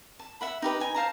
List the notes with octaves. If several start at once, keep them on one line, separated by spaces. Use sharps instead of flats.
A5
E5 F#5 B5
D#4 G4 B4
D#4 G#5
C5 F5 A5 A#5